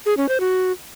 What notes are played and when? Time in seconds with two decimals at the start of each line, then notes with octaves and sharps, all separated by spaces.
0.06 G#4
0.17 C#4
0.29 C5
0.40 F#4